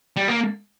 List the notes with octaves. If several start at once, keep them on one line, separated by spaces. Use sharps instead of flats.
G3
A#3